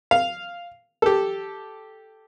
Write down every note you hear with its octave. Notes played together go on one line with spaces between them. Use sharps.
F5
G4 A4